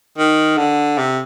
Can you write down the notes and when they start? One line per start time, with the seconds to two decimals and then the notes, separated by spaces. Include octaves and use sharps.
0.18 D#3
0.57 D3
0.98 C3